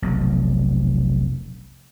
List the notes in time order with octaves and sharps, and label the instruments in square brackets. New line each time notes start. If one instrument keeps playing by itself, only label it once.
[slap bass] F1 B1